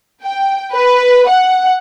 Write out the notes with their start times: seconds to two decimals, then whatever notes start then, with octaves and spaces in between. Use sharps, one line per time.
0.24 G5
0.72 B4
1.28 F#5